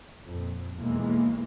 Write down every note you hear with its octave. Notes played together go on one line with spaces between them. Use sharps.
F2 A#2
B1 E2 E3 G#3 A#3